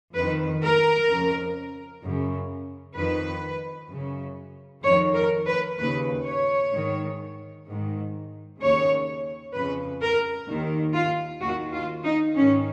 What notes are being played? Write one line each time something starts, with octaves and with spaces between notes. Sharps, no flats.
F2 D#3 B4
A#4
F2 C#3
F#2 C#3
F2 D#3 B4
F#2 C#3
F2 D#3 C#5
A#4
B4
D#2 C#3 B4
C#5
G#2 D#3
G#2 D#3
D#2 C#3 C#5
F2 C#3 B4
A#4
D#2 D#3
F4
D#2 D#3 F#4
F4
D#4
G#2 D#3 C#4